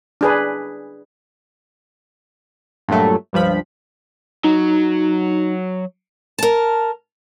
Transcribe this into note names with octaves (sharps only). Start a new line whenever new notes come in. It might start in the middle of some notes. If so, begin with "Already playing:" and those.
D4 G#4 B4
G2 A#2 F#3 A3
C#2 G2 F3 B5
F#3 D#4
A#4 A5